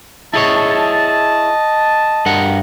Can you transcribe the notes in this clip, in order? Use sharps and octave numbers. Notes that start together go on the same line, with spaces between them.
E4 G#4 C#5 D#5 A5
G2 A#4 F#5